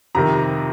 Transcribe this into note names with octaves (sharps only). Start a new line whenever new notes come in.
F2 C3 D#3 A#5